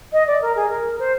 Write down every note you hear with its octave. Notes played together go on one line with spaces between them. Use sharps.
D#5
D5
A#4
G#4
A#4
C5